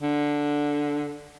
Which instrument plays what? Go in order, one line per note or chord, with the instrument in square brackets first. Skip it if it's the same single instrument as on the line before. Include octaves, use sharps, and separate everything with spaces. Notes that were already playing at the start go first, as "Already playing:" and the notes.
[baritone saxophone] D3